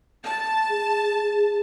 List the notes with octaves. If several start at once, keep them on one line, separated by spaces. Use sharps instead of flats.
A5
G#4